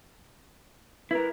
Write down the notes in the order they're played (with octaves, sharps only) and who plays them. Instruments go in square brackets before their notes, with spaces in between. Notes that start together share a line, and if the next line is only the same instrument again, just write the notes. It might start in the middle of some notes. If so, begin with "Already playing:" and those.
[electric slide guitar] E4 A#4 [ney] B4